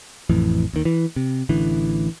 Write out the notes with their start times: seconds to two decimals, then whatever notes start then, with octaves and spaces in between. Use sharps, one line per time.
0.30 A1 F2 A2 E3
0.73 D#2 D#3
0.85 E3
1.16 C3
1.49 A1 D3 E3